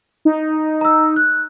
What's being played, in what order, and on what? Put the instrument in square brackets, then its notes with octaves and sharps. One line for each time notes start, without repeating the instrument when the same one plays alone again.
[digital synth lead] D#4
[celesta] A#5 E6
F#6